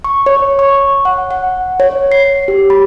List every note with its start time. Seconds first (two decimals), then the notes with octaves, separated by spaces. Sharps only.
0.04 C#6
0.26 C#5
0.59 C#6
1.05 F#5
1.31 F#5
1.80 C#5
2.12 C7
2.48 G4
2.70 B5